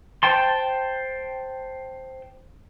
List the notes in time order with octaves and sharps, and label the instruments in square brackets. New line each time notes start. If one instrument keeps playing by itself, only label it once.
[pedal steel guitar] C5 G5 A5 C6